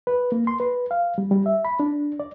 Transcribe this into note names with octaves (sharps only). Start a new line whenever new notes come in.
B4
A#3
C6
B4
F5
G3
G3
E5
B5
D4
D5